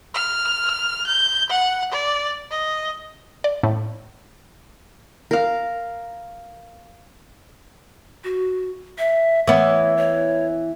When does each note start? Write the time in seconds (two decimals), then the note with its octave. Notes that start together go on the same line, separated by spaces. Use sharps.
0.14 F6
1.07 G6
1.50 F#5
1.91 D5
2.51 D#5
3.44 D5
3.63 A2
5.31 A#4 F5
8.24 F#4
8.98 E5
9.47 E3 B3 C#5
9.97 C#5